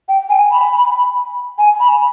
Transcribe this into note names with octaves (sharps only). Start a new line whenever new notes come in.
G5
G#5
B5
G#5
B5